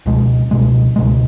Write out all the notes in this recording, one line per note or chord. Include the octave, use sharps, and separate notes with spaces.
C#2 B2 G#3
C#2 B2 G#3
C#2 B2 G#3